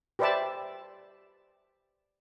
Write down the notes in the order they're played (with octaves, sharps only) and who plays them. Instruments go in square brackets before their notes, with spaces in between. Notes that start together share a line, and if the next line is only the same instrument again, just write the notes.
[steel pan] G4 B4 C5 D5 E5 A5